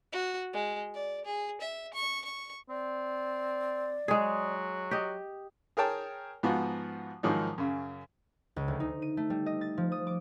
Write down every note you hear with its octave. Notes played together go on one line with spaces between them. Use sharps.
F#4
G#3
D5
G#4
E5
C#6
C#6
C4 D5
F#3 G#3 G#4
G4 D#5
G#4 A#4 C#5 G5 A5 A#5
G#2 F3 B3 F4 F#4
G#2 D#3 F3 F#3 D#4
F#2 C#3
C#2
D2
D#4
D#7
A3
G3
D#5
A6
F3
D#6
D6